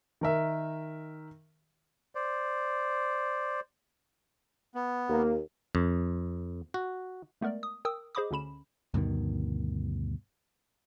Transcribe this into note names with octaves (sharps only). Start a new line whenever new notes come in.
D#3 A#4 E5
C5 D5
B3
D#2 A#3
F2
F#4
G#3 A3 B3 A#4 D5
D#6
A#4 G5 D#6 E6
G#4 C5 D#5 B5 D6 D#6
D2 D3 C#4 B5 E7
D2 G2 B2 D#3